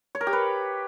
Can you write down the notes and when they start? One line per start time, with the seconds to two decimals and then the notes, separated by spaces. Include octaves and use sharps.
0.15 C#5
0.21 A#4
0.27 G4
0.33 B4